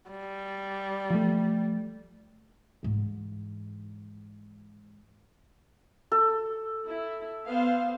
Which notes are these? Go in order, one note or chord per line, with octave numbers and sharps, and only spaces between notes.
G3
F3 A3
G#2 E3
A4
E4
B3 C5 F5